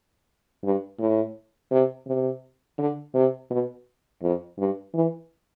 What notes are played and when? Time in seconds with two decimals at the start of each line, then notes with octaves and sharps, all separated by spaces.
0.64 G2
0.99 A2
1.71 C3
2.07 C3
2.79 D3
3.15 C3
3.50 B2
4.22 F2
4.58 G2
4.94 E3